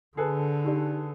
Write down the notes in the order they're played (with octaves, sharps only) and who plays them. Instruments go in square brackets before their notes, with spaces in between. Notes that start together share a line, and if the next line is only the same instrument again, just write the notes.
[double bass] D3 [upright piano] G#4 A4 B4
[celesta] D#4 G4 D5